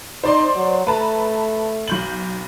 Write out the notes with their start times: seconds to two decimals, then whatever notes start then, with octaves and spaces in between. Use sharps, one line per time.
0.24 D#4 C5 D5 C6
0.56 F#3
0.87 A3 B4 A5 A#5
1.88 B1 G6 F#7